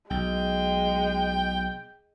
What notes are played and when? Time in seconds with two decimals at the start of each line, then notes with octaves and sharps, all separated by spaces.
0.10 B1 G#3 G5